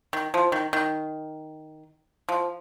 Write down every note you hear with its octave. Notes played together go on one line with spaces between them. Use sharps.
D#3
F3
D#3
D#3
F3